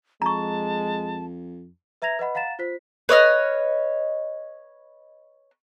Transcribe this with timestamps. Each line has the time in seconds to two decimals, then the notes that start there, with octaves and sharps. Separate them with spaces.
0.22 F2 G#3 A5 A#5 C#6
2.02 B4 E5 A#5 G#6 A#6 F7
2.19 B4 D#5 F#5 B5
2.35 F5 F#5 A#5 A6 E7
2.59 F4 C5 B6
3.09 B4 C#5 D#5 F6